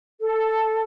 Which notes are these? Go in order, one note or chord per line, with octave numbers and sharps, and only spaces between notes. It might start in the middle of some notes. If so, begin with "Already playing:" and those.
A4